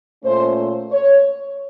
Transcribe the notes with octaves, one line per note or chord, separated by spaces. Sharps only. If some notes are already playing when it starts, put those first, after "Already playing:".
A#2 A3 C#4 C5
C#5